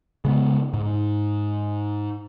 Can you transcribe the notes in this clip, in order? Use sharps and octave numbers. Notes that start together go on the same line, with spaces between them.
C#3 G#3 B3
G#2